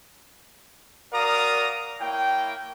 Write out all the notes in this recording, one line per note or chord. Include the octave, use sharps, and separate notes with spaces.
F#4 A#4 D5 F5 A#5 D#6
A#3 E4 C#5 G5